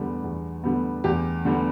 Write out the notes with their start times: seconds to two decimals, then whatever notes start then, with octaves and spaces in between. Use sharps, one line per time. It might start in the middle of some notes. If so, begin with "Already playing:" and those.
Already playing: E2 D3 G3 B3
0.24 E2
0.64 D3 G3 B3
1.04 E2 G4
1.45 D3 G3 B3